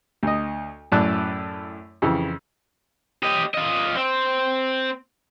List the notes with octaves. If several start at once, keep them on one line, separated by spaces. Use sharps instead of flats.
D2 D#5
F#2 A2 D5 A5 F#6
F2 C#3 E3
G4 D#5
F4 D#5
C4